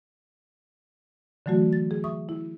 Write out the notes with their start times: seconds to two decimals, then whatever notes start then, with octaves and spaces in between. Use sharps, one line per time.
1.46 D3 E3 F#3 A3 F#4
1.73 A6
1.91 G#4
2.04 E5 C#6 D#6
2.29 E4